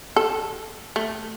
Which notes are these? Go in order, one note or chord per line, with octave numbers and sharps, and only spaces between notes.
A4
A3